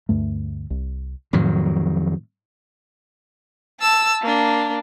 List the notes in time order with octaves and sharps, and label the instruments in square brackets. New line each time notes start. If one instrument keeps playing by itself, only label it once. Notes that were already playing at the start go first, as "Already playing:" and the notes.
[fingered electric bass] D2 G2 A3
C2
[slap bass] F2 D#3 F#3 [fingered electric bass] A2
[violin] A5 E6
A#3 D4